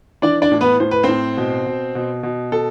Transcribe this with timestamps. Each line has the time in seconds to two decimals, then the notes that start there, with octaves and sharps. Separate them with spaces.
0.22 E3 D4 D5
0.42 D4 D5
0.52 A2
0.61 B3 B4
0.80 A2 C5
0.91 B4
1.03 A2 C4 C5
1.37 B2
1.66 B2
1.95 B2
2.23 B2
2.52 B2 A4